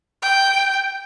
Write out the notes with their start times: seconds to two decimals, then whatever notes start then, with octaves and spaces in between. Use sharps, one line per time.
0.22 G5